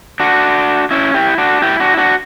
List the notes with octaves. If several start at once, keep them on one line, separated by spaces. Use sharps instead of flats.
D4 F#4
C#4 E4
E4 G4
D4 F#4
E4 G4
D4 F#4
E4
D4 F#4